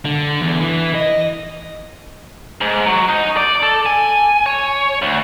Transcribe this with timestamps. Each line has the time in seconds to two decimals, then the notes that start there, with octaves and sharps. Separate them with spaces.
0.05 D3
0.41 E2
0.61 E3
0.95 D#5
2.61 G#2
2.86 F#3
3.09 D#4
3.37 D5
3.63 A4
3.86 G#5
4.46 C#5
5.02 D2